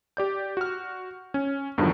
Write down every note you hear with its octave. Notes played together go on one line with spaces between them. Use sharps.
G4 D5 G6
F#4 F6
C#4
E2 G2 D3 D#3 F3 F#3